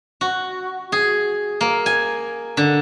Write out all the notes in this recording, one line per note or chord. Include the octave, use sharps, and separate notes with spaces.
F#4
G#4
A#3
G#5
D3